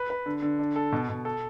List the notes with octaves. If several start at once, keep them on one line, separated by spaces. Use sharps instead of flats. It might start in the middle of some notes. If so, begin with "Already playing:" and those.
Already playing: B4
B4
D3
D3
D4
A4
B2
B2
A4